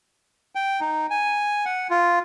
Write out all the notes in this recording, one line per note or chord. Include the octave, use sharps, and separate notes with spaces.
G5
D#4
G#5
F#5
F4